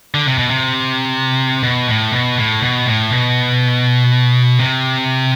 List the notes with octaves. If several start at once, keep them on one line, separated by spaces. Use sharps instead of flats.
D3
C3
B2
C3
B2
A2
B2
A2
B2
A2
B2
C3